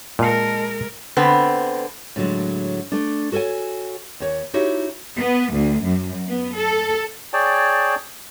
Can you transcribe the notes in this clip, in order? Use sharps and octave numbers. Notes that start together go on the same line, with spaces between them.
A#2 G#3 A#4 D#5 F5 A5 C#7
D3 B3 C4
A2 D3 F#3 G#3
A3 D4
F#4 A4 A#4 C#5 G#5
D#2 C#5
D#4 E4 F#4 G4 C#5
B3
D2
F#2
B3
A4
G#4 C#5 D5 G5 A5